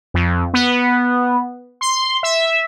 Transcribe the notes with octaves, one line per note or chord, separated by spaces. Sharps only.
F2
B3
C6
E5